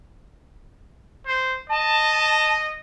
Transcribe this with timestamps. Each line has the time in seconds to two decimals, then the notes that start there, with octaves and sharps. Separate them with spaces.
1.26 C5
1.70 D#5 A5